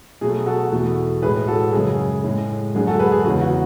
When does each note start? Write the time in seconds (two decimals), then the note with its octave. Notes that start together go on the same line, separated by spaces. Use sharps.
0.21 B2 F#3 A3 G#4
0.46 F#4 A4
0.72 E2 B2 A3
1.22 A2 G#4 B4
1.26 G#3
1.47 F#4 A4
1.73 F#2 C#3 G#3 G#4
2.24 A2 G#3
2.75 F#2 D3 G#3 G#4
2.87 F#4 A4
2.99 G#4 B4
3.12 G#4
3.25 E2 C#3 G#3 F#4
3.41 F#4